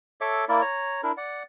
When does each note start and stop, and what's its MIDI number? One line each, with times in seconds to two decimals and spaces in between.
0.21 0.45 69
0.21 0.45 73
0.21 0.45 76
0.21 0.45 86
0.49 0.62 58
0.49 0.62 64
0.49 0.62 70
0.49 0.62 74
0.62 1.01 73
0.62 1.01 82
1.03 1.12 62
1.03 1.12 64
1.03 1.12 70
1.17 1.43 74
1.17 1.43 78